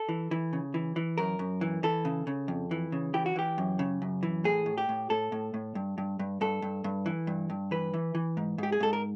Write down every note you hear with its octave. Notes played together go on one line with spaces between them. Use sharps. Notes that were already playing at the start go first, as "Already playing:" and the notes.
Already playing: A4
E3
E3
C#3
E3
E3
F#2 A#4
F#2
E3
E3 A4
C#3
C#3
F2
E3
C#3
E3 G4
F#4
E3 G4
F#2
C#3
F#2
E3
A2 G#4
A2
G4
A2
A2 A4
A2
A2
G2
G2
G2
G2 A4
G2
G2
E3
G2
G2
E3 B4
E3
E3
G#2
G#2 G4
G#4
G#2 A4
A#4